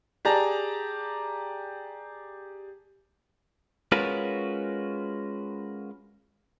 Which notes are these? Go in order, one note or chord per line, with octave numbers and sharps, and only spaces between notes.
G4 G#4 D5 A5 A#5
G#3 C#4 F4 F#4 A#4 B4